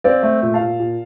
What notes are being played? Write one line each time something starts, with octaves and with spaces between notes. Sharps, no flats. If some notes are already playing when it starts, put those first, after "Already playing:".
C4 D5 F5
A3
A#2
F5 A5
A#2
A#2